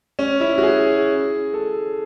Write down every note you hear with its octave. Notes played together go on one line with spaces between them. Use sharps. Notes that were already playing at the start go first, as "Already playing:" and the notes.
C#4
E4
F#4
G#4
A4